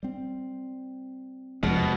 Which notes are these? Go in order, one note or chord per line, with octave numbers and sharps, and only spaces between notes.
G3 C4
F1 E2 B2 F3 G#3 F6